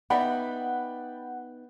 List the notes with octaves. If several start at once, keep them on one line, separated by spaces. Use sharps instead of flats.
B3 D#4 D5 E5 F#5 G5 B5